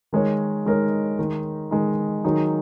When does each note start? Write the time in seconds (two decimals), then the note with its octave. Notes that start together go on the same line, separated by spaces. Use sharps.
0.13 D#3 G#3 D#4 A#4 C#5
0.66 D#3 G#3 D#4 A#4 C#5
1.19 D#3 G#3 D#4
1.71 D#3 G#3 D#4
2.24 D#3 F#3 D#4 G#4